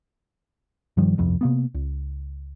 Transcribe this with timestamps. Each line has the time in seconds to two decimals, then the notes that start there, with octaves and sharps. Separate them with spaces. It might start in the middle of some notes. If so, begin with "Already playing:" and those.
0.97 G2 D#3 F3 G3
1.17 G1 C2 F2
1.41 C3 A#3 B3
1.74 C#2